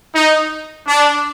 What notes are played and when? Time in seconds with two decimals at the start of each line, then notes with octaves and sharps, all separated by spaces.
0.13 D#4
0.86 D4